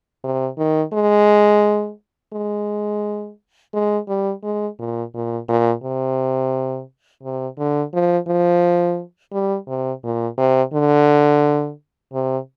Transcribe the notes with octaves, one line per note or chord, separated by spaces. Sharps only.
C3
D#3
G#3
G#3
G#3
G3
G#3
A#2
A#2
A#2
C3
C3
D3
F3
F3
G3
C3
A#2
C3
D3
C3